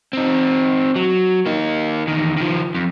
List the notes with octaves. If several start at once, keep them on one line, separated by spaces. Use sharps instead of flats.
C4 D#4
F#3
A#3 D#4
E2 D#3
D#3 F3
F2